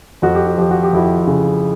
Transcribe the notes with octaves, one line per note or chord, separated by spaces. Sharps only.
F2 F#4
G4
F#4
F3 G4
F#4
G4
F2 E4 F#4
C#3